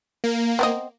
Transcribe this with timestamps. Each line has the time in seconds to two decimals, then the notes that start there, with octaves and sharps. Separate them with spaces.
0.24 A#3
0.59 B3 C4 D#5